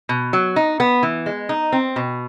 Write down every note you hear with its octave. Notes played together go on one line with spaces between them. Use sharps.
B2
F#3
D#4
B3
E3
G#3
D#4
C4
B2